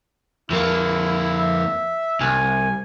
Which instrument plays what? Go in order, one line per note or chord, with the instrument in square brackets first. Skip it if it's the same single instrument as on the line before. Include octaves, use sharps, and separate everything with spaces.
[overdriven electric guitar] F2 A#3 [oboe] E4
[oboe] E5
[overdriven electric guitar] C2 [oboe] G#5